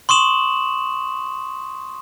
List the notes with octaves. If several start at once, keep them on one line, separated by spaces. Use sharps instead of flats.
C6 C#6 D#6 E7 F#7